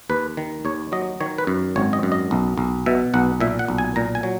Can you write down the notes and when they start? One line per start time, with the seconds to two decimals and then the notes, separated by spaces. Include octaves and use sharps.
0.10 D#2 B4
0.37 D#3
0.65 D#2 C#5
0.92 F#3 D#5
1.20 D#3 C#5
1.38 B4
1.47 F#2
1.76 G#1 C#5
1.93 D#5
2.03 F#2
2.12 D#5
2.31 B1
2.58 B1
2.86 B2 E5
3.14 B1 F#5
3.40 A#2 E5
3.59 F#5
3.68 B1
3.78 G#5
3.96 A#2 A#5
4.15 G#5
4.23 F#3